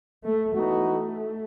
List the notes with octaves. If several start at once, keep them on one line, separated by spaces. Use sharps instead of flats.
A3
E3 A3 B3 D#4 F#4
A3